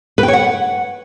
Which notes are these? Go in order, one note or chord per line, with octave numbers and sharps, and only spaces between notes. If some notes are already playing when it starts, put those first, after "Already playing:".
B4
G5
C#5
F#5